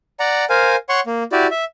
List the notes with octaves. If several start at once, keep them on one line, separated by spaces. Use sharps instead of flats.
D5 F#5 A#5
A#4 C5 F5 G#5
C#5 F#5 C6 C#6
A#3
E4 F#4 G4 D5
E5